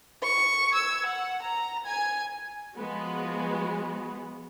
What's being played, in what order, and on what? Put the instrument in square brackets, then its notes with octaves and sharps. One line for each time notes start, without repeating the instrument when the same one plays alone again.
[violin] C#6
E6 G#6
F#5
A#5
G#5 G#6
[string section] F3 G#3 B3 F#4